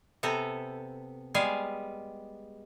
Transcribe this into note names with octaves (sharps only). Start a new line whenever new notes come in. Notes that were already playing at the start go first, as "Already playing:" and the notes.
C3 B3 A4 G#5 A#5
G3 G#3 B3 G#4 F5 G#5